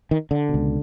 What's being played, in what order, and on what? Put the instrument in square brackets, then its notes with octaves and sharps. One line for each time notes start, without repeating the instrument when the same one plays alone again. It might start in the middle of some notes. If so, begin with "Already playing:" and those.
[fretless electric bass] D#3
D3
B2
C#2